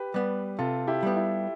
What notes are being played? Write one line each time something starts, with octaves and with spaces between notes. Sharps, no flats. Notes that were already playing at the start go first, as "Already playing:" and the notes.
Already playing: G4 B4
G3 B3
C3 F4 A4
E4 G4
G3 B3
E4